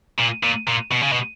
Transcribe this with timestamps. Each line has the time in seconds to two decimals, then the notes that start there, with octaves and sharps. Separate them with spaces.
0.19 A#2
0.44 A#2
0.68 A#2
0.92 B2
1.02 C#3
1.12 B2